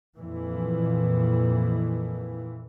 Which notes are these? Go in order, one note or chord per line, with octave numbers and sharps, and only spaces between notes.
F2 A#2 E3